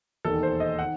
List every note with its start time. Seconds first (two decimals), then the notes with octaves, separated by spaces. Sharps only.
0.25 E1 D#2 D#3 A4
0.43 C5
0.60 D#5
0.79 D#3 F#5